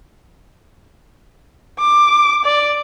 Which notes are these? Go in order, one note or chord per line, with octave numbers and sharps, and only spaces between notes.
D6
D5